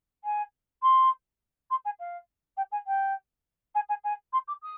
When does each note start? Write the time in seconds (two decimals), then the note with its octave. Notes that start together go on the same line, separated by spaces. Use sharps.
0.24 G#5
0.82 C6
1.70 C6
1.84 G#5
1.99 F5
2.57 G5
2.71 G#5
2.86 G5
3.74 G#5
3.89 G#5
4.04 G#5
4.32 C6
4.47 D6
4.62 D#6